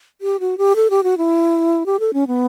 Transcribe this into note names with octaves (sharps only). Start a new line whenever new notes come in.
G4
F#4
G4
A4
G4
F#4
E4
G4
A4
C#4
B3